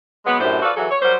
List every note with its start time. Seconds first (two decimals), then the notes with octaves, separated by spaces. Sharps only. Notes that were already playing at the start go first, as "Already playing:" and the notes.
0.25 F#3 G#3 B3
0.40 F#2 A2 D4 G4 C5
0.62 F4 F#4 A4 B4 D5
0.76 E3 F#3 F#4 G#4 A4
0.90 C#5
1.02 F#3 G3 A#4 C5